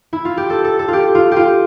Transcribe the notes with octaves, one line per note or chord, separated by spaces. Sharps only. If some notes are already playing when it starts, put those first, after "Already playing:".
E4
F4
G4
A4
A4
A4
F4 G4
F4
F4 G4